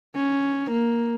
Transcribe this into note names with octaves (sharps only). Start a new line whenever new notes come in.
C#4
A#3